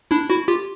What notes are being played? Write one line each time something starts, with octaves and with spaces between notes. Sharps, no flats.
D4 E4
E4 F#4
F4 G4